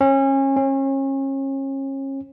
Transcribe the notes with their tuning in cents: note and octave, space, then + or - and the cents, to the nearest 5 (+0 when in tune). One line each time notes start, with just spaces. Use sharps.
C#4 -30
C#4 -35